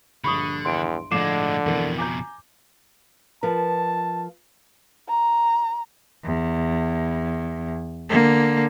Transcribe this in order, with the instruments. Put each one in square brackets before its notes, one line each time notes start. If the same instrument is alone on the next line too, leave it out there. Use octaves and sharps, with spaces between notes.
[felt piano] A#1 G2 [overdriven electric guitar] D3 [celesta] B5 C#6 D#6
[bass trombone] E2 [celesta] C6 D7
[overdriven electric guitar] A2 G#3 [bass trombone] D3 [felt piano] F3 [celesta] D6 C7 E7
[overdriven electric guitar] F2 B2 [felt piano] E3 A#4
[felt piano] G#5 A#5 G6 [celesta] D6
[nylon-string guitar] F3 A#4 B4 [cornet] A5
[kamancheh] A#5
[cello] E2
D3 A#3